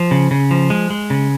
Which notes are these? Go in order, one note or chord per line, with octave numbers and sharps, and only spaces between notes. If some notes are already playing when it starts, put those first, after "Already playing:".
Already playing: F3
C#3
C#3
F3
G#3
G#3
C#3